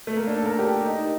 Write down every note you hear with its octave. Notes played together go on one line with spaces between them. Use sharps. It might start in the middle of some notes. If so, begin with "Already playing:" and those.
A3
A#3
D4
A4
A#4
G4
D#4